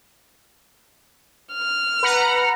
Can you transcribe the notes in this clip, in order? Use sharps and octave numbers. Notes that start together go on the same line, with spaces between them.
F6
B4 F#5 A#5